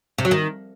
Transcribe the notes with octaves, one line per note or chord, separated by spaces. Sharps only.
C3
F#3
D#3